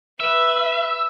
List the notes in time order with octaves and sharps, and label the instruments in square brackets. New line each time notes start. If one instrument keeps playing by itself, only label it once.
[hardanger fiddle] B4 [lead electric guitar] E5